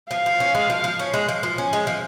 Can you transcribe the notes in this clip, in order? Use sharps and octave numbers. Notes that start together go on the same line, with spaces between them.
F3 F5
F3
C#4
G#3
F3
F3
C#4
G#3
F3
F3
C#4
G#3
F3